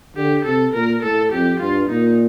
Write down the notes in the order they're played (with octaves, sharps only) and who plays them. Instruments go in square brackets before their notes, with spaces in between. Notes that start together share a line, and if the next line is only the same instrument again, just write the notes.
[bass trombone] D3 [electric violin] G4
[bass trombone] C3 [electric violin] A4
[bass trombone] A#2 [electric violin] A#4
[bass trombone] A2 [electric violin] A4
[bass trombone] F2 [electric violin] G4
[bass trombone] G2 [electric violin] F4
[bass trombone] A#2 [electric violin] D#4